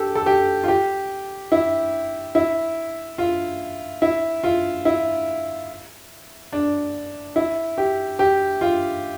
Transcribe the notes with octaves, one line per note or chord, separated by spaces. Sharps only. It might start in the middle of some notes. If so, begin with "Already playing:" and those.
Already playing: G4 A4
A4
G4
F4
G4
E4
E4
F4
E4
F4
E4
D4
E4
G4
G4
F4